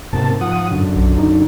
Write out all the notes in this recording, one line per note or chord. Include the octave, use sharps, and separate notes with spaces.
G#2 C3 A#3 A5
F3 F#5 D#6
F#2 D3
B1
D#4